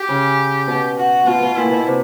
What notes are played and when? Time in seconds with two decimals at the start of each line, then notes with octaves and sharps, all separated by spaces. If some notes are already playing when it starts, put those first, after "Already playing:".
Already playing: G4
0.09 C#3
0.67 B2
0.97 F#4
1.26 B2 F4
1.42 B2
1.56 A#2 E4
1.72 B2
1.86 C3